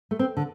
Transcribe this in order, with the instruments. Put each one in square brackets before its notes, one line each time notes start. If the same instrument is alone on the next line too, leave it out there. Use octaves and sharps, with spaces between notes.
[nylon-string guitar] A3
C4
D3